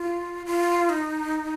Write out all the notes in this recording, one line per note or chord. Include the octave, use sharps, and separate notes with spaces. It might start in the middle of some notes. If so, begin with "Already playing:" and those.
Already playing: F4
F4
D#4